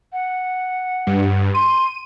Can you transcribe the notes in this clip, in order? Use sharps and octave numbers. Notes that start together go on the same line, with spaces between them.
F#5
G2
C6 D#7